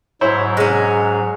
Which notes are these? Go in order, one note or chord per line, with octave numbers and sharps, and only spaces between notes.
G#2 F#3 E4 C5 C#5
G#3 C#4